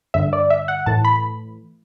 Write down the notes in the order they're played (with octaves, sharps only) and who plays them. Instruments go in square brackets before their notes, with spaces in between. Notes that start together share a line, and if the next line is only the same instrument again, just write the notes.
[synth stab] G2 D3 E5
D5
E5
F#5
A2 E3 A5
B5